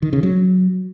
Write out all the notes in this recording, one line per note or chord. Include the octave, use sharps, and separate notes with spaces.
D#3
C#3
F#3